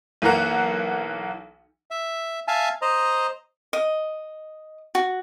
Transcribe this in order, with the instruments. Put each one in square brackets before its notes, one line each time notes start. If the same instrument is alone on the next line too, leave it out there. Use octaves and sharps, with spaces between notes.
[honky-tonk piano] B1 E3 A#3 A#4 F#5
[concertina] E5
E5 F5 G#5 A5
C5 D#5 A#5
[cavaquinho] D#5
F#4